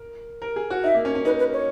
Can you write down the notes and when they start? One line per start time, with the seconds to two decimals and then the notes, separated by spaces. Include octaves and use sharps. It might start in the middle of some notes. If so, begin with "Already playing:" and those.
Already playing: A#4
0.42 A#4
0.56 G#4
0.70 F#4
0.84 D#4 E5
0.94 A#3
1.05 C#4
1.15 C#4
1.25 D#4 B4
1.39 B4
1.53 C#5